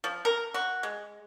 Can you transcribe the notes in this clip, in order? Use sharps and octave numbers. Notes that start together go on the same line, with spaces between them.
F3
A#4
F#4
G#3